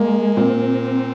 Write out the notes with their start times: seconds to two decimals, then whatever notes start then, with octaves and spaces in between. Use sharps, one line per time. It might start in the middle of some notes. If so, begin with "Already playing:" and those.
Already playing: G#3 A#3
0.37 A#2 C4